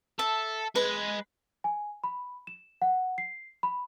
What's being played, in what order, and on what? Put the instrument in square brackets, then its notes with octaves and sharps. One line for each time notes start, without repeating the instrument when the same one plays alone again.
[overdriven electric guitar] A4 [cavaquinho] E5
[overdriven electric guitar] G#3 [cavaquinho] B4
[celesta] G#5
B5
E7
F#5
C7
B5